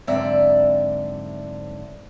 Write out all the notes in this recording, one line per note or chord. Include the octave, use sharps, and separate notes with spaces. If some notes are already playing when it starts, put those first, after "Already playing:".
G#2 D3 F#3 C4 D5 E5